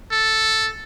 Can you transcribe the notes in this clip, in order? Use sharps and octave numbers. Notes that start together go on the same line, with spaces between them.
A4